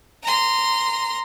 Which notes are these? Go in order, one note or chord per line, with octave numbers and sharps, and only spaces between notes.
A#5 C6